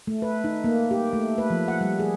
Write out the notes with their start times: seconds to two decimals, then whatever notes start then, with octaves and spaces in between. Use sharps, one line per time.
0.07 A3
0.22 B4
0.44 D#4
0.64 A#3
0.91 G4
1.13 A3
1.38 B4
1.50 F3
1.68 F#5
1.81 G3
2.00 G#4